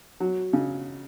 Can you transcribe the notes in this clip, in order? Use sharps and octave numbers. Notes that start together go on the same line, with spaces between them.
F#3
C#3